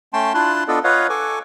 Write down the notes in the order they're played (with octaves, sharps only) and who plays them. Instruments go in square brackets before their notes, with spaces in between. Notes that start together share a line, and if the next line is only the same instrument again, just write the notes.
[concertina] A3 C#4 G5 A5 C6
D4 E4 F4 A5 C6 F#6
B3 D4 F4 A4 D5 D#5
F4 B4 C#5 D#5 F5 F#5
A4 G#5 C#6 D6